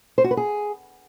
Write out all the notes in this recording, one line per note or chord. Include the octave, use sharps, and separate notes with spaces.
C5
F#4
B4
G#4